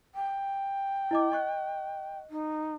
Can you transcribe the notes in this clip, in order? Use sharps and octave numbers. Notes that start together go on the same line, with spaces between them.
G5
E4 D#5 D6
D#5 C#6 F#6
D#4